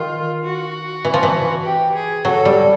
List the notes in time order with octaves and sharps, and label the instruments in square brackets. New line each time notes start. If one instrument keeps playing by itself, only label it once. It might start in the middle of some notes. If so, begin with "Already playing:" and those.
Already playing: [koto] D#3 [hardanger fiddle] F4
[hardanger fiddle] F#4
[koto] E3
F3
E3
[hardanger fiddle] G4
G#4
[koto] F#3 [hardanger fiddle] A4
[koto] G3